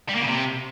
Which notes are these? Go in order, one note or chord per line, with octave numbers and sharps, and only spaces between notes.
G3
A#3
C#3
C3